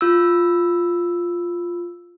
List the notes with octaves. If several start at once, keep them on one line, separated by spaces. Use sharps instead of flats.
F4 E6